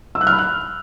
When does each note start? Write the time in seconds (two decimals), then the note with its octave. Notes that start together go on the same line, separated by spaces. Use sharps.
0.15 E6
0.21 F#6
0.27 F6
0.33 B5
0.38 F#6